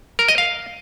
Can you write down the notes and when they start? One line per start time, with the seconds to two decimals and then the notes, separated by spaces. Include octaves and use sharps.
0.19 A#4
0.28 D#5
0.38 F5